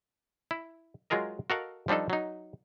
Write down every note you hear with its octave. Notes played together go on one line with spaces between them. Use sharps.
E4
F#3 G#3 F4 G#4 A#4 D#5
F#4 A4 A#4 D#5 F5 F#5
F3 G3 D4 D#4 A4
F#3 D#4